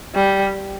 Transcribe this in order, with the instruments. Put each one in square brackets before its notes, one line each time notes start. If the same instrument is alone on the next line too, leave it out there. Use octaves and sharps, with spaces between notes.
[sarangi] G3